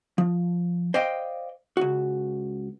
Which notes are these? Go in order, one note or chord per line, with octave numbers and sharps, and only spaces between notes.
F3
C5 D5 D#5 F5 G5
C#2 F#4